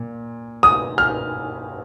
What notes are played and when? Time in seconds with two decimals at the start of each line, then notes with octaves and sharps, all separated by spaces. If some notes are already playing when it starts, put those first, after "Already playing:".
Already playing: A#2
0.63 D#6
0.98 F6